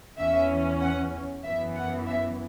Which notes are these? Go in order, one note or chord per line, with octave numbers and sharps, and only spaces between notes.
E2 E3 C#4 E5
F#5
F#2 E3 B3 E5
F#5
E5